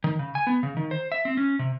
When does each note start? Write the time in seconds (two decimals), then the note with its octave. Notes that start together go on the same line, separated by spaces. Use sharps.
0.04 D#3
0.19 C#3
0.35 G#5
0.47 B3
0.63 C#3
0.77 D#3
0.91 C5
1.12 E5
1.25 C4
1.37 C#4
1.59 C3